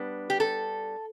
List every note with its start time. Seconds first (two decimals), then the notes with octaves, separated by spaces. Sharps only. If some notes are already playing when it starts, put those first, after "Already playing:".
Already playing: G3 B3 D4
0.30 G4
0.40 A4